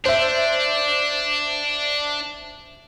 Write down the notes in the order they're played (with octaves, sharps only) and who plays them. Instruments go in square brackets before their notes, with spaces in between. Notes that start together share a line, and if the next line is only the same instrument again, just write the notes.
[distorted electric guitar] D4 [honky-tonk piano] C5 E5